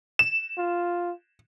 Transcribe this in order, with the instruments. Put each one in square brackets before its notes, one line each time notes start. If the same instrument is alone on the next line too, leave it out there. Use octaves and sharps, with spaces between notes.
[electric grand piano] E7
[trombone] F4